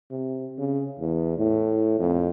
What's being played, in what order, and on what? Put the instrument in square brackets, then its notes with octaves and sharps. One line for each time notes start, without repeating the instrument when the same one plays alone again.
[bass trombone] C3
C#3
E2
A2
F2